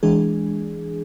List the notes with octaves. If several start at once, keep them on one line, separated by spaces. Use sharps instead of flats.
E3 G#3 D4 G#4